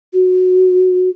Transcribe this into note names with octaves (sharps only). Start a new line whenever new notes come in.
F#4